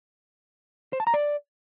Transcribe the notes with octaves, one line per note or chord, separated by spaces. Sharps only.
C5
A5
A#5
D5